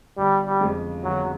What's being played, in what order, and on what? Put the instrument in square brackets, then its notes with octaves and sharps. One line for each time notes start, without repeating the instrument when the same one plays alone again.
[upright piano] G1 [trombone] G3
[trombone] G3
[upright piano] F2 C#3 F3 G#3
[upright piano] G1 [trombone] F#3